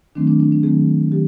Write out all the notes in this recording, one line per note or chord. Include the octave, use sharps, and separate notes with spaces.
D#3 F#3 A3 C4 D4
D4
D4
D4
D#3 F#3 A3 C4 G#4
D#3 F#3 G4